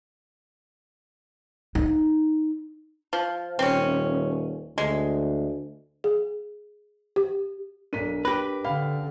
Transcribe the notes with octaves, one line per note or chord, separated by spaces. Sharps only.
D#4
F3
D#1 C4 C#4
D2 G#3
G#4
G4
B1 D4 A#4 B6 D#7
G4 B4 A#6
D3 F5 G5 B5